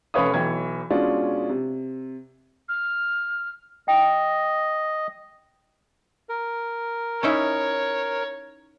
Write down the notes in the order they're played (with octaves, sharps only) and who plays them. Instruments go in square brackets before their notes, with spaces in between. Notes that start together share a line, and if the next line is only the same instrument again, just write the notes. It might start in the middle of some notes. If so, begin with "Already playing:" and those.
[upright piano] F1 C#4 B4 C#5 F5 D#6
B1 E3 C#5 G5 G#6
B2 G#3 C#4 D4 F4
C3
[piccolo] F6
[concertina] D#5 [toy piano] G5
[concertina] A#4
[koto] C#4 D#4 E4 [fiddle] C#5